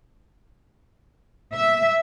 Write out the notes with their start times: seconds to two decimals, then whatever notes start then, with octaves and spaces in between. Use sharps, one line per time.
1.54 E5